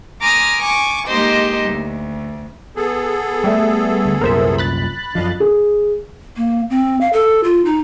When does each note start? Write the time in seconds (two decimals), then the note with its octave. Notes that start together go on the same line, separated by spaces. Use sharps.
0.22 G#5 A#5 C6 D6 D#6 F6
0.60 G#5 C#6 D6
1.08 G#3 A#3 D#4 G4 C5 D#5
1.68 D2
2.76 B3 G#4 A4
3.44 G3 A3 E5
4.05 D2
4.21 C2 F#2 A#2 A#4 C5 E5
4.58 B5 F#6 A6
5.15 F#2 F3 D4 D#5 F5
5.40 G#4
6.37 A#3
6.70 C4
7.01 F5
7.13 A4
7.44 F4
7.65 D#4